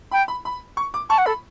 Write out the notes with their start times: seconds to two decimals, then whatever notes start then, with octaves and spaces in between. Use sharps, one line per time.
0.11 G5 B5
0.28 B5
0.45 B5
0.77 C#6
0.94 D6
1.10 A5 C#6
1.18 F#5
1.26 A4 B5